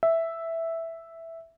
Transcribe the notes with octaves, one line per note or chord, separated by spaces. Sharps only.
E5